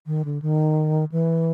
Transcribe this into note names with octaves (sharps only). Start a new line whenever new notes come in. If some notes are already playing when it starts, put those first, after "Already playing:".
D#3
D3
D#3
E3